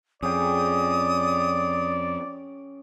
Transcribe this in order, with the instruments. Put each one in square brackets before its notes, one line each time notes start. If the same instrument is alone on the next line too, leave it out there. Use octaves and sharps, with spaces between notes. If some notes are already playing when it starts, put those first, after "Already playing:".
[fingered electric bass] F2 [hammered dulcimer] C#4 G#4 G5 [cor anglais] D5 [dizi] D#6